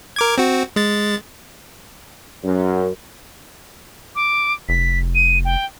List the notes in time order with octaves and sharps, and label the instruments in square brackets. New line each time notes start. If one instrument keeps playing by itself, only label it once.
[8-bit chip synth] A#4 D6 G#6
C4 F#4
G#3 A6
[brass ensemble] F#2
[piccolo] D6
[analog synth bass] F1 [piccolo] B6
[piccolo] D#7
G5